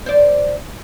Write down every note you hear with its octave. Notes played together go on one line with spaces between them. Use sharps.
C5 D5